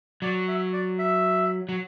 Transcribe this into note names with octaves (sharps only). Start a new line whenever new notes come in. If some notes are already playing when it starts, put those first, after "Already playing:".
F#3 D5
E5
D5
E5
F#3